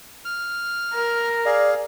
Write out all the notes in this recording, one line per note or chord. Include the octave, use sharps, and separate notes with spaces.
F6
A#4
G#4 D5 F5